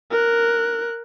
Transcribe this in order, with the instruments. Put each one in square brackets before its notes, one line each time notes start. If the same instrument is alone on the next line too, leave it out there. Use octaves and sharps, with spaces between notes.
[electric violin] A#4 F#6